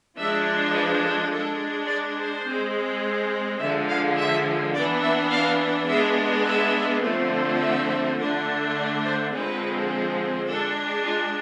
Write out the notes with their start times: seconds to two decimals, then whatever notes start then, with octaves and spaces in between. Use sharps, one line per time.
0.16 F3 G#3 D4 E5
0.73 B4
1.02 A4
1.31 G#3 D4 A4
1.88 D5
2.17 C5
2.46 G#3 C4
3.59 D3 F3 G#3 E5
3.88 F5
4.18 E5
4.74 E3 B3 D4 D5
5.03 E5
5.31 F5
5.89 G#3 B3 D4 E5
6.45 E5
7.02 D3 F3 A3 C4
7.61 E5
8.17 D3 A3 D4
8.75 D5
9.04 C5
9.31 D3 F3 G#3 C4 B4
10.46 G#3 D4 A4
11.03 F4